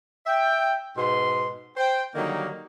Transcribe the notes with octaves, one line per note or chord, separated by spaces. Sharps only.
E5 G5
G#2 B2 B3 C6
C5 G5
D3 D#3 F#3 G3 A#3 D#4